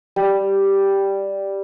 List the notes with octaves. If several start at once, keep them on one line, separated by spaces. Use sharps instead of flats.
G3